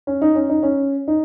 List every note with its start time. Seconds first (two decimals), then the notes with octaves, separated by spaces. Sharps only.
0.07 C#4
0.22 D#4
0.35 C#4
0.49 D#4
0.63 C#4
1.08 D#4